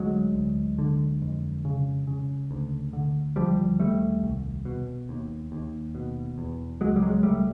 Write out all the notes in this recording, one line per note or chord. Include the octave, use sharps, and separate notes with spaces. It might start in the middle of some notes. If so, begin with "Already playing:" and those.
Already playing: D2 F#3 G#3
D2
D3
F2
C#3
C#3
D2
D3
D#2 F3 G3
D#2 G3 A3
C2
B2
D#2
D#2
B2
E2
C#2 F#3 G#3
G3
F#3 G#3
C#2 G3 A3